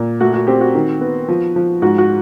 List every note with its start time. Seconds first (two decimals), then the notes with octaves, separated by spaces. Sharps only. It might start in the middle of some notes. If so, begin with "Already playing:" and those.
Already playing: A#2
0.21 A3 F#4
0.34 F#4
0.47 C4 G4
0.61 F#4
0.75 D#3
1.01 B3
1.28 F3
1.56 F3
1.82 G#2 F#4
1.98 F#4